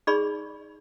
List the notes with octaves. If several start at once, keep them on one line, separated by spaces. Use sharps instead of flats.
D#4 G#4 D5 B5 C#6